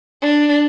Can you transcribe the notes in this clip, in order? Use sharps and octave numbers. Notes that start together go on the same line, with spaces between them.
D4